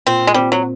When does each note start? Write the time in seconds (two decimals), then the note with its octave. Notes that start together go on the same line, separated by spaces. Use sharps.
0.07 A#2 C4
0.27 G#3
0.34 G3 C4
0.52 F#3